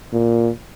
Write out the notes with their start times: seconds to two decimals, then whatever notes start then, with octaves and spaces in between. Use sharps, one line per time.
0.13 A#2